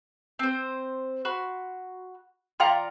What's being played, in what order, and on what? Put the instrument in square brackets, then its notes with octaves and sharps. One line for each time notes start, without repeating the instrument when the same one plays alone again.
[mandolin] C4 C5
F#4 B5 C6
[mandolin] F4 D5 A#5 [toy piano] F5 G5 C6